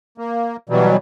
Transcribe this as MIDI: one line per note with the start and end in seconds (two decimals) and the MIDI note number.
0.18 0.57 58
0.69 0.97 47
0.69 0.97 52
0.69 0.97 54
0.69 0.97 55